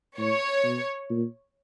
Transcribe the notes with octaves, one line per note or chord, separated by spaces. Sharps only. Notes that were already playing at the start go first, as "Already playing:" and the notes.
A2 C#5
B2
A#2